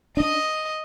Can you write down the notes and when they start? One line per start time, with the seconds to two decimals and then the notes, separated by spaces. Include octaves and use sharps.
0.17 D4 D#5